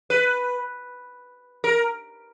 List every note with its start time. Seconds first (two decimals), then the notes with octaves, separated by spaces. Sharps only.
0.10 B4
1.64 A#4